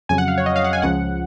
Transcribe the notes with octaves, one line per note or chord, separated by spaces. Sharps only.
F2 C#3 F#3 G#5
F#5
F5
C#5
D#5
F5
F#5
G#5
C#2 C#3 F3 F#5